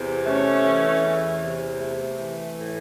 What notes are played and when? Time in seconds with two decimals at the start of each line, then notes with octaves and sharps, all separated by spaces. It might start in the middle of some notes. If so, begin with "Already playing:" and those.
Already playing: E2 C3
0.26 A3 C#4
0.65 E3
1.03 E2
1.42 C3
1.80 A3
2.19 E3
2.58 A2